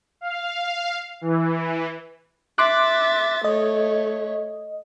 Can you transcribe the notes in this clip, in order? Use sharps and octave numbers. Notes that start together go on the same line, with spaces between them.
F5
E3
E5 C6 D6 F#6 A6
A3 C#5 D#5